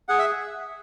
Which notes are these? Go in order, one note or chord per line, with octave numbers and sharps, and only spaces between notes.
G#4 F#5
E5